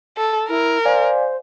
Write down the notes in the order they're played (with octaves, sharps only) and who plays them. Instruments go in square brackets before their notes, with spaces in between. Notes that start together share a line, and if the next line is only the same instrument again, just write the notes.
[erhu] A4
[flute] E4 [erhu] A#4
[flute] C5 [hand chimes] D5 F5 G#5